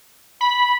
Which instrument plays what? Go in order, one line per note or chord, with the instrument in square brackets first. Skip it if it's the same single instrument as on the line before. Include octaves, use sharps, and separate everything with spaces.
[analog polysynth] B5